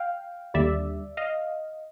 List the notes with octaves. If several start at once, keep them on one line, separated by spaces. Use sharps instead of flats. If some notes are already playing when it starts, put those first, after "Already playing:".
Already playing: F5 G5
D#2 D3 G3 D5 E5
D#5 F5